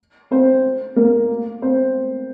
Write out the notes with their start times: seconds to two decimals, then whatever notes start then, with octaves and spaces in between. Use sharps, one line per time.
0.31 C4 C5
0.96 A#3 A#4
1.62 C4 C5